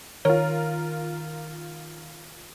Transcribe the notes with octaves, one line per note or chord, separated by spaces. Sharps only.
D#3 F4 A#4 C#5